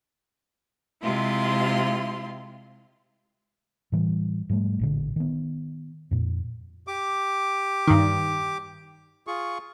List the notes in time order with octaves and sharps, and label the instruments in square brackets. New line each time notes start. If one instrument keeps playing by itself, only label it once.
[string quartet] C3 G#3 E4 F4 C6
[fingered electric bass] A2 E3 G3
G#2 F3 G3 A3
A1 A#2 D3
D#3 B3
F2 A#2
[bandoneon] G4 D6
[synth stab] G2 D#3
[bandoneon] F4 G#4 C#6